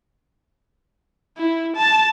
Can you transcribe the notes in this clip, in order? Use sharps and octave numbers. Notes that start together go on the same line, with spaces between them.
E4
A5